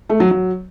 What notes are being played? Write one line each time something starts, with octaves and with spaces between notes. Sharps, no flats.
A3
F#3
F#3